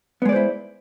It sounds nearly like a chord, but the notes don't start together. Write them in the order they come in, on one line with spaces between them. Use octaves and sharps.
B3 G#3 D5 C5 E4